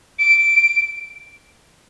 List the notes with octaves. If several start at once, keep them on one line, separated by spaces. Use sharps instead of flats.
D7